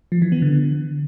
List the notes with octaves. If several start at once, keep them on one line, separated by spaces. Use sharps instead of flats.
F3
E3
B3
D3